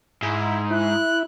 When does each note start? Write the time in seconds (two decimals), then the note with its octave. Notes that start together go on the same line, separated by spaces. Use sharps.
0.23 G#2 E4
0.70 E4 F#6